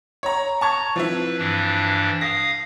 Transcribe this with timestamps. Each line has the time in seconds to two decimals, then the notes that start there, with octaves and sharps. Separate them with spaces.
0.23 C#5 A#5
0.61 A5 A#5 C#6 G#6
0.96 F3 C4 E4 B4
1.38 G2 E3 D4
2.21 F5 D#6 A#6